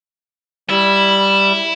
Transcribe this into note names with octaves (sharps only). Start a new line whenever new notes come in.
G3 E4